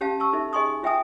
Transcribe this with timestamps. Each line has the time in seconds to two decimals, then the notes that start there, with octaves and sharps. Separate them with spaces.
0.01 C#4 G4 F5 A5
0.20 A5 C#6 E6
0.33 D#4 A4 E5
0.53 G#4 D#5 G#5 C6 C#6 D#6
0.83 F4 E5 G5 G#5 D#6